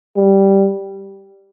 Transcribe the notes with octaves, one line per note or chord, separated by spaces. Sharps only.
G3